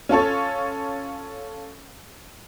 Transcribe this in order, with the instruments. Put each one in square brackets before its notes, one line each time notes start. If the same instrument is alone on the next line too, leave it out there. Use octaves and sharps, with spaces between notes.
[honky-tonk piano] C#4 F4 A4 C#5